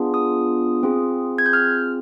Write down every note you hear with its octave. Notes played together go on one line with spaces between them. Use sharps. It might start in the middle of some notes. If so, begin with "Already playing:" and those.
Already playing: B3 D4 F4 G#4
D#6
C4 F4 G#4
G#6
G6
F6